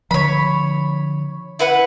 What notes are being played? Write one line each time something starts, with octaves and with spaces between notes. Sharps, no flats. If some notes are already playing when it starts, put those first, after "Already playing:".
D3 F3 C#5 B5
E4 B4 F#5